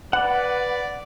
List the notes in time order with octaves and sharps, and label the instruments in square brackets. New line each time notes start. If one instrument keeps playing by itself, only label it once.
[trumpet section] B4 [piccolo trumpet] D5 [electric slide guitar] F#5